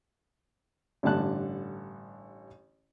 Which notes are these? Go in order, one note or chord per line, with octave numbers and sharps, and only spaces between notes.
A1 G2 D3 A5 F#6